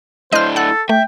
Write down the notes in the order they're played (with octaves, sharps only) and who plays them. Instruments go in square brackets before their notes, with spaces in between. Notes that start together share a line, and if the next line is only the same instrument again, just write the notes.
[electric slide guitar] A3 D4 E4 [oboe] C5 [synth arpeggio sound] D#5 F6
[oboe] A4 [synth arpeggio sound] F#5 F#6
[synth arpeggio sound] A3 [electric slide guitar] E5 [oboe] G5